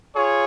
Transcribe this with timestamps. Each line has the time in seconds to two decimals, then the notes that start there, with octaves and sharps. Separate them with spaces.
0.16 F4 G#4 C#5